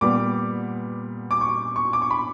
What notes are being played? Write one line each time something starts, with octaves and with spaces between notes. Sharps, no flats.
A#2 G3 B3 D6
D6
C#6
C#6
D6
C#6
B5